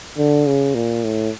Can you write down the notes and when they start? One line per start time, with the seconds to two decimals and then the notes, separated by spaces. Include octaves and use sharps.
0.18 D3
0.47 C#3
0.75 A#2
1.04 A2